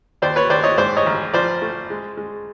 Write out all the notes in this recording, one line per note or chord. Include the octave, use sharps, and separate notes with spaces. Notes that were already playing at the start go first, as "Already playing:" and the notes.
D#2 C5 D5
B4 C#5
D#2 C5 D5
C#5 D#5
G#2 C5 D5
C#5 D#5
A1
F3 C5 D5
A3
G#3
G#3